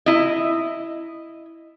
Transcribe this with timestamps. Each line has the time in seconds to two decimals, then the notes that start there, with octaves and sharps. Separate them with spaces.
0.06 E4 D#5